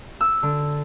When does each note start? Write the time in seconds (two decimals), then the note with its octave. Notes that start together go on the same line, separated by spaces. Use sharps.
0.21 E6
0.43 D3